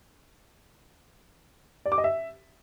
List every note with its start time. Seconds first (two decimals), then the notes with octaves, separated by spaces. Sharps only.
1.86 D5
1.92 D6
1.98 D#5
2.04 E5